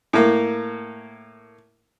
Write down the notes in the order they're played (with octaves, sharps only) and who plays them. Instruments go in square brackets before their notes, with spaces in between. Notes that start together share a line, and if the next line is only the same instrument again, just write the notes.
[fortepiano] A2 A#3